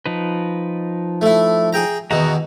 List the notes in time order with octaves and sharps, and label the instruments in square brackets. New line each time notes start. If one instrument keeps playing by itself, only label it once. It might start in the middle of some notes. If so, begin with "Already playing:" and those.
[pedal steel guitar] F3 D#4 B4
[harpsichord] A3 E4
G#4 G5 A#5
[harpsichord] E2 B2 D#3 [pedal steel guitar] F#4 A#5